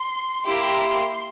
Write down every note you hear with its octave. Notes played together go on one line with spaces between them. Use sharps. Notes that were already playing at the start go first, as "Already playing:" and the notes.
Already playing: C6
A#3 E4 G4 C6
C6